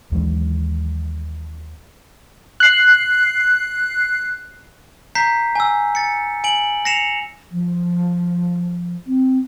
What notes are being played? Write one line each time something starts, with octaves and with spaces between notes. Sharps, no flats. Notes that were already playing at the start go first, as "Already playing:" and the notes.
D#2 E3 F#3 G#3
F#6 C7
A#5 G6 B6 C7
G#5 E6
A6 C#7
G#5 D7 F#7
A#6 C7 C#7 E7 F7
F3
C4